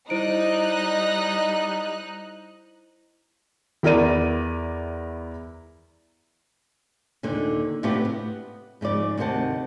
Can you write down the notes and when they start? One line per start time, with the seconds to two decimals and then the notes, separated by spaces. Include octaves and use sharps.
0.10 G3 D#4 E4 C5 F#6 D7
3.83 E2 E4 A#4 D5 D#7
7.23 D#2 A#2 D3
7.83 A2 C3 B3 D4 F4 G4
8.05 B3
8.81 G#2 C#3 F3 D5
9.17 D2 C3 D#3 C5 F#5 A5